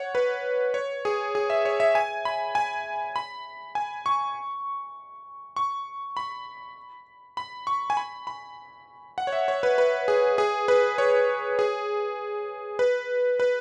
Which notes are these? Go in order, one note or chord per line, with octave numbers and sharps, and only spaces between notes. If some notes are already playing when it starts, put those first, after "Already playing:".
Already playing: C#5 F#5
B4
C#5
G#4
G#4
E5
C#5
E5
G#5
B5
G#5
B5
G#5
C#6
C#6
B5
B5
C#6
G#5
B5
B5
F#5
C#5
E5
C#5
B4
B4
G#4
G#4
B4
C#5
G#4
B4
B4